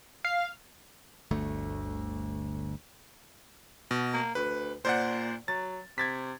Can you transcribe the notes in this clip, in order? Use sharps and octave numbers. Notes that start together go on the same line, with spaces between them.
F5
G1 D2 A3
B2
A#3
D2 B4
A#2 C5 D5 F#5
F#3 A6
C3 G#6 A6 B6